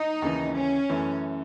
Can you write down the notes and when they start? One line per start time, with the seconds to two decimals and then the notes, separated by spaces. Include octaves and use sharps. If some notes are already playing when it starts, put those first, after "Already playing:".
Already playing: D#4
0.22 D#2 C#3 E3
0.55 C#4
0.89 F#2 E3 A3